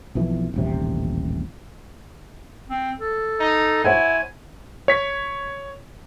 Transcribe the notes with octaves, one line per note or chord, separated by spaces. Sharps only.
B1 F2 E3
D#1 A1 C3
C4
A4
D#4
E4 C5 C#5 F#5 G#5
C#5 B6